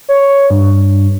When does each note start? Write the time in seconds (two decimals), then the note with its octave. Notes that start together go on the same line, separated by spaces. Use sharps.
0.09 C#5
0.50 G2